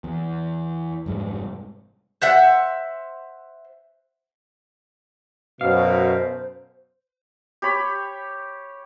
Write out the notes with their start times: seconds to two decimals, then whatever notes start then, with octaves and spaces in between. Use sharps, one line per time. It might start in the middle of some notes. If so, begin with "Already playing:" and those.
0.04 E2
1.06 F1 G#2 G3
2.22 C5 E5 F#5
5.61 F#2 B2 C5 F5
7.62 G4 C#5 B5